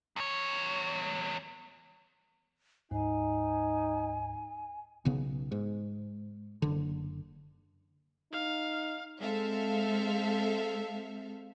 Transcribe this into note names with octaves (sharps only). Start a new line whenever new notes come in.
E2 C#5
D2 G#2 D#4 G#5
B1 C#3 B3
G#2
F#1 D3
D#4 F5
G#3 C4 A4 E5 F5